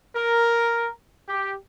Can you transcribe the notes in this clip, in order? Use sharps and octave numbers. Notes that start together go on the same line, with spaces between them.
A#4
G4